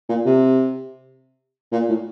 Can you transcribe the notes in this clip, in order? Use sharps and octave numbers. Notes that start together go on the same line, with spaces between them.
A#2
C3
A#2
A2